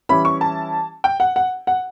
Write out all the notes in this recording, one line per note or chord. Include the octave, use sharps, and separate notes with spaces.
E3 G3 C#4 E4 B5
C#6
A5
G5
F#5
F#5
F#5